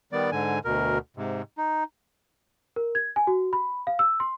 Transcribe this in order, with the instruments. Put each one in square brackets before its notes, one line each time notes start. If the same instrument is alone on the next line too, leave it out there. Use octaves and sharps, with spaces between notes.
[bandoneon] D#3 G3 B3 D5
G#2 D3 G#5
D2 B2 A#4
G#2 C3
D#4
[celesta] A#4
G#6
G#5
F#4
B5
F5
E6
C6